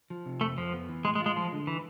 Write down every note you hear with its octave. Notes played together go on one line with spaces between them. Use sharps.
F3
C3
F2 A3
F2 F3
B3
E3
A2 G#3
G#3
F4
G#3
F3 G#3
D3
E3